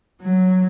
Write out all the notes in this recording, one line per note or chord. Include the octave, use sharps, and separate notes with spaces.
F#3